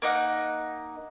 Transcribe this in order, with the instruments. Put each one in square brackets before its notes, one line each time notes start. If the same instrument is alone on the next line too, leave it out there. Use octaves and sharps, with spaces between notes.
[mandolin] A#3 D#4 F#5